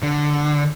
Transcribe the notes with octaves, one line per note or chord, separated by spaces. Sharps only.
D3